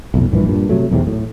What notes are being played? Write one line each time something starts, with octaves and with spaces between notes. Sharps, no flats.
B1 F2 A2
A#1 G2 A#2 E3
G2 A#2
C3 F#3 A3
B1 E2 G#2 C3
A2